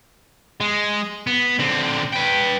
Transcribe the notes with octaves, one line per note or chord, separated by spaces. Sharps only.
G#3
B3
D3 C4
B4 G5